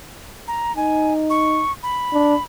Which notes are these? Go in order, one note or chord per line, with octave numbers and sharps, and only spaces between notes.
A#5
D#4 G#5
C#6
B5
D4